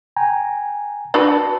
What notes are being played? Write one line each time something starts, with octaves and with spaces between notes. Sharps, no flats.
G5 G#5 A#5
D4 F#4 B4 A5